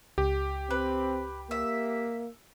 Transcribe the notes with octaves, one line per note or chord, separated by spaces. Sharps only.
C#2 G4
C4 B4
A#3 E5